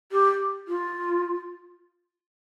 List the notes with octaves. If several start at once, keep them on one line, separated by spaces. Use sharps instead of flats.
G4
F4